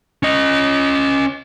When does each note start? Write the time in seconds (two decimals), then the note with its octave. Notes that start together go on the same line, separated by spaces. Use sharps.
0.23 C#4 D#5